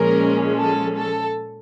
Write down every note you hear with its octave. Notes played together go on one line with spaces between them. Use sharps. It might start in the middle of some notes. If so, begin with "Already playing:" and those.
Already playing: A#2 F3 G#3 C#4 A#4
A4
A4